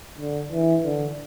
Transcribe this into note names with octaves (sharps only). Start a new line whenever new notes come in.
D3
E3
D3